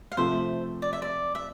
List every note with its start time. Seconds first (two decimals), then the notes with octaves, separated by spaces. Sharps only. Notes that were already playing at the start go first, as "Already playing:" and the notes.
0.12 F5
0.17 C3 F3 A3 C5 E5
0.82 D5
0.93 E5
1.02 D5
1.35 E5